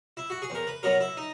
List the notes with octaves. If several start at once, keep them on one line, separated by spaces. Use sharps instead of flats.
E4
F#4
G#4
E2 A#4
B4
B2 F#3 B3 A#4
E4
D#4